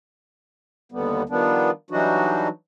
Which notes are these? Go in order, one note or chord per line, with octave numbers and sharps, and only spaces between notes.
D#2 D3 G3 B3
D#3 F3 G3 B3 D4
E3 F#3 G3 D4 D#4 F#4